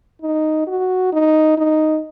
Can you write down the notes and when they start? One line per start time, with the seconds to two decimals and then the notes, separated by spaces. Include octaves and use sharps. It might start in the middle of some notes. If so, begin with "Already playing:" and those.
0.22 D#4
0.67 F#4
1.13 D#4
1.58 D#4